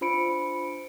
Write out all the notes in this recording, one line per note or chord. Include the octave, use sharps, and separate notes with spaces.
D4 F4 C5 B5 C#7 D7